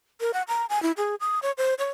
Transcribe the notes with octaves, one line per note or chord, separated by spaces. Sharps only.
A#4
F#5
A#5
G#5
E4
G#4
D#6
C#5
C5
C#5